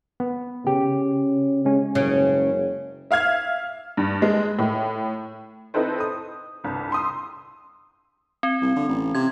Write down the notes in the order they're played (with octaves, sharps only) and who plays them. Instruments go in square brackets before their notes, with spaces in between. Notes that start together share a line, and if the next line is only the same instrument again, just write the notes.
[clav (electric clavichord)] B3
[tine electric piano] C#3 [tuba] C#4 [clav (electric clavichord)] G4
[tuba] C#3 [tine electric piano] G#3 C#4
[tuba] F#1 [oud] C#3
[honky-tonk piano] E5 F5 F6 G#6
G2
G#3
A2
C4 D#4 E4 A4 B4 C5
D#6
G1 C2
C6 D#6 E6
[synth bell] C4
[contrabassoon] C2
D3
A1
[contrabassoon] C3 [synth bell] G#6